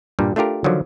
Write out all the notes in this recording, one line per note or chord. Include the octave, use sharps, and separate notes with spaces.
G2 A#2 G3
A3 D4 F4 G4 A#4
D3 D#3 F3 F#3